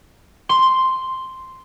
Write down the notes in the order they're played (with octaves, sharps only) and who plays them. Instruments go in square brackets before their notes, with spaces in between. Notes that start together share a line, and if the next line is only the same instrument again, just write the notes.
[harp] C6